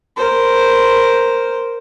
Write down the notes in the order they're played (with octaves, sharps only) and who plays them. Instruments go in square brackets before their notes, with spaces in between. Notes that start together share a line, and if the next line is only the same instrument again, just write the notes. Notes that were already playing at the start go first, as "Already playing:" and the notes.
[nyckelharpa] A#4 C5